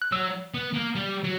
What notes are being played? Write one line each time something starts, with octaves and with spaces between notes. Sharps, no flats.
F#6
F#3 E6
B3
A#3
G3
F#3